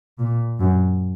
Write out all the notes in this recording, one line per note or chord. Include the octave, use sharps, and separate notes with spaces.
A#2
F#2